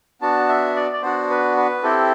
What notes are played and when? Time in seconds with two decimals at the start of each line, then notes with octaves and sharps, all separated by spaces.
0.22 B3 D4 F#4 A5
0.49 E5
0.76 D5
0.93 D5
1.02 B3 D4 F#4 C5
1.30 B4
1.57 B4
1.83 C4 E4 G4 A4